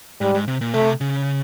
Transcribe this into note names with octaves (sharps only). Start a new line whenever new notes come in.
G#2 G3
G#2
C3
A#2
C3 A3
C#3